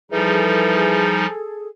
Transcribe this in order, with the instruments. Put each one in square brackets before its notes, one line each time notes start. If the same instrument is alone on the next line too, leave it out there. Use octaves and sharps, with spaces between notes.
[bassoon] E3 [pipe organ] F3 G3 D#4 [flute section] G#4 A4